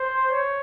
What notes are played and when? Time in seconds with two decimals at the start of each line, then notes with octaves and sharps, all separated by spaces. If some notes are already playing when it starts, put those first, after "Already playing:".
Already playing: C5
0.32 C#5